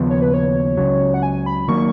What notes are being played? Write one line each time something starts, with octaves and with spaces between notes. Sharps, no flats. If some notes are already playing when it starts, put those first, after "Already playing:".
Already playing: D#2 C#3 F3 B3
C#5
B4
C#5
C#2 C#3 F#3
F#5
G#5
B5
D#3 F#3 A#3 C#6